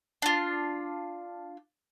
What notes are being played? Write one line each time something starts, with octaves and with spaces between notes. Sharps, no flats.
D4 F4